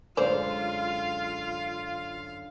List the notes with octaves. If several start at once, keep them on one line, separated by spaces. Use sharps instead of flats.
F#2 D3 G#3 F4 C5 D5 F5